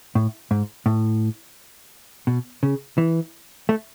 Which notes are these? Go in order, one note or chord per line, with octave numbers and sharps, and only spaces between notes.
A2
G#2
A2
B2
C#3
E3
A3